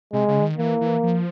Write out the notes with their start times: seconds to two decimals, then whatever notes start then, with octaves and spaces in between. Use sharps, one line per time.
0.13 C3 G#3
0.28 C#3
0.39 D3
0.43 D#3
0.58 E3 A#3
0.81 E3
1.03 F3